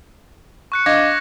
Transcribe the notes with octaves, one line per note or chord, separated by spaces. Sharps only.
C#6 F#6 C#7
D4 D#5 F5 D6 G#6 A#6